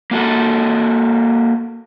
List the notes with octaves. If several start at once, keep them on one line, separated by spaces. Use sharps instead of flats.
A#3 F#4 A4